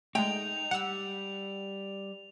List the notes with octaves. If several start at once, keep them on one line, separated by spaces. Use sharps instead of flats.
G#3 A3 D#4 G5 F7
G3 F#5 E6